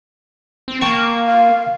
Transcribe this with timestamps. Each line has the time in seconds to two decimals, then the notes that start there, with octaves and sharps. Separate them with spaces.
0.68 C4
0.81 A#3 G5 A5 C#6
1.27 F5